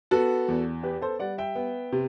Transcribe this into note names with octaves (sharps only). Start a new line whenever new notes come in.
B3 F#4 A4
E2
B3 G4 B4
A4 C5
G3 D5 F#5
E5 G5
B3
C3